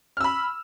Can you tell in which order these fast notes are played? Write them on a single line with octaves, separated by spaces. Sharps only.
F6 E6 B5